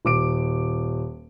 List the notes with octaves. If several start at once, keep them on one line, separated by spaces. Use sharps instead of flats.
D#1 D6 D7